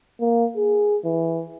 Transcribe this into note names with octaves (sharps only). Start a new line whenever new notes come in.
A#3
G#4
E3